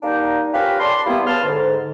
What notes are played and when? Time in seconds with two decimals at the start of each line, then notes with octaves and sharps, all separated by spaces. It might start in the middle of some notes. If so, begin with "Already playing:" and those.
0.03 G3 A#3 D4 D#4
0.54 C#4 F4 G4 A#4 B4
0.80 D5 A5 B5 C6
1.07 E3 G3 A#3 B3 E4
1.26 E2 C#3 B4 A5 C6 F6
1.44 G#2 D3